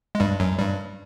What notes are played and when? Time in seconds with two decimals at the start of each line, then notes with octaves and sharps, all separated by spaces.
0.15 G#3
0.20 G2 G3
0.40 F#2 F#3
0.59 G2 G3